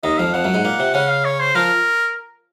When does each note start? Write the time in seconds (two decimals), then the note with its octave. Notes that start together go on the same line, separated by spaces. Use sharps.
0.04 D#2 D#3 D#5
0.18 F2 F3 F5
0.34 F2 F3 F#5
0.44 F#2 F#3
0.54 G#2 G#3
0.65 A#2 A#3
0.79 C3 C4
0.94 C#3 C#4 F#5
1.10 F5
1.25 C#5
1.40 C5
1.55 F3 F4 A#4